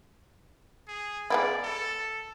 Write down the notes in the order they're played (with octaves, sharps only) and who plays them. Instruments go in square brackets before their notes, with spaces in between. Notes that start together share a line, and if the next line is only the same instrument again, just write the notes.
[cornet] G#4
[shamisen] G#3 B3 E4 [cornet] D5
[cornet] A4